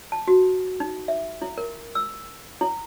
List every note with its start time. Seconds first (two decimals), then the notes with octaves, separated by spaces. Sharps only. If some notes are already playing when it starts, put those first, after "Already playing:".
0.12 A5
0.28 F#4
0.80 D#4
1.08 E5
1.42 E4
1.58 A#4
1.95 E6
2.61 E4